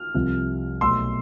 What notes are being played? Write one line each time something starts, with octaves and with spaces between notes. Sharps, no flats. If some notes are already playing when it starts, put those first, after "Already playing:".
Already playing: F6
C2 C3 F3 C4
B1 B2 A3 C6 E6